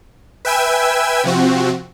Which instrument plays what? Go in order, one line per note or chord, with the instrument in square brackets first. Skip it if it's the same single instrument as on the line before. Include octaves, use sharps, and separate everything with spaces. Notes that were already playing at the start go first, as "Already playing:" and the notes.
[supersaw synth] B4 E5 G5 G#5 E6 G#6
C3 F3 C4 F#4